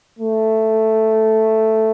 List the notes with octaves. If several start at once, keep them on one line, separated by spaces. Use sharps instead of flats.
A3